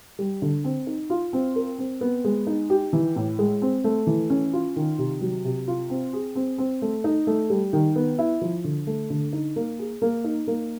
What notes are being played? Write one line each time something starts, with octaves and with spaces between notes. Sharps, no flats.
G3
D3
C4
D#4
F4
C4
A#4
C4
B3
G#3
D#4
G4
E3
A2
G#3
C4
A3
E3
C#4
F4
D#3
C3
F#3
C3
F4
C4
G#4
C4
C4
A3
D#4
A3
G3
D#3
B3
E4
F3
D3
A3
D3
D#4
A#3
G#4
A#3
D#4
A#3